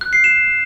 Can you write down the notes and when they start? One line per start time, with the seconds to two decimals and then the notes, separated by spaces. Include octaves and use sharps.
0.01 F#6
0.13 C7
0.24 E7